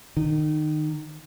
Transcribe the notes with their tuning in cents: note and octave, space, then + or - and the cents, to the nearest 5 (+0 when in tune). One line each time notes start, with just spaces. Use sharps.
D#3 -25